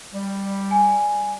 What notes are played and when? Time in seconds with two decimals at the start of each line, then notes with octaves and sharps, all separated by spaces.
0.14 G3
0.71 G#5